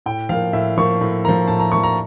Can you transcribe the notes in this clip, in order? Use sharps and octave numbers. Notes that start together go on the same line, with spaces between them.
A2 G5
F3 A#3 F5
A2 E5
F3 A#3 C#6
A2
F3 A#3 A#5
A2 A5
A#5
F3 A#3 C#6
A#5